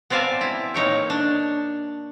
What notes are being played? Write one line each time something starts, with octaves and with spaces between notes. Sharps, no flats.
B3 C4 D5 F5 G#5 A5
E4
A#2 D#4 C#5 G5
D4